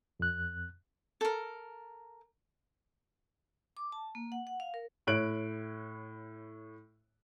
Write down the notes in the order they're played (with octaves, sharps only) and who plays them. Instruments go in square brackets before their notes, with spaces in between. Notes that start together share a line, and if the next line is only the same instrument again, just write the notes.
[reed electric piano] F2 F#6
[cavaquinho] A4 A#4
[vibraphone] D6
A5
A#3
F#5
F#5
F5
A#4
[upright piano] A2 E4 C#5 F#6 D7 F#7